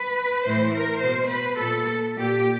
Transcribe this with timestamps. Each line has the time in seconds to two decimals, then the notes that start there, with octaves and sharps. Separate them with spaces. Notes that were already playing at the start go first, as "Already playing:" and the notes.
Already playing: B4
0.46 A2 E3 C5
0.74 A#4
1.03 B2 C5
1.31 B4
1.60 A#2 A4
2.16 A#2 G4